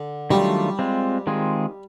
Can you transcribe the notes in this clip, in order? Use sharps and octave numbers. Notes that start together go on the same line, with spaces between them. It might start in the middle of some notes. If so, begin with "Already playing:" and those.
Already playing: D3
D#3 F#3 G3 A3 D4 F4
G#3 C4 F4
D#3 G#3 C4 F4 G#4